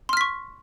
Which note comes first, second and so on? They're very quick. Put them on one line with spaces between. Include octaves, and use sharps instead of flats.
C6 F6 B6 C#6